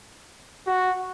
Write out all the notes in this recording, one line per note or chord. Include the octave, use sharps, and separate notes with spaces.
F#4